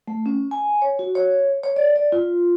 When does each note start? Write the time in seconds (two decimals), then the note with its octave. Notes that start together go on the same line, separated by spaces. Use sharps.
0.08 A3
0.26 C#4
0.51 G#5
0.82 C#5
0.99 F#4
1.15 C#5
1.64 C#5
1.76 D5
1.96 D5
2.12 F4